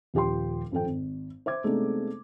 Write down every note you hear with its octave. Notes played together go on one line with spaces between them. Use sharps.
D#1 F3 G4 G5 C6
G#1 F2 A4 G5
G#1
C5 E5 D6 G#6
C3 G#3 A3 B3 D4 D#4